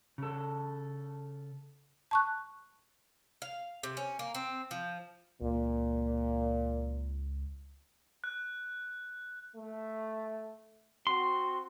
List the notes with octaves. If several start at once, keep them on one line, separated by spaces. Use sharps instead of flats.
C#3 A4
A5 C#6 F#6
F5
C3
C#4
A#3
C4
F3
C#2 A#2
F#6
A3
C4 F#4 C6